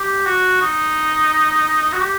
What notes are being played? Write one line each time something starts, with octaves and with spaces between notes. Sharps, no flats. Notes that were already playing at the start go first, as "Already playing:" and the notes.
Already playing: G4
F#4
D#4
D#4
F#4
G4